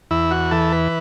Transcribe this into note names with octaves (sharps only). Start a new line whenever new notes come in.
E2 E4
F#4
E3 A4
B4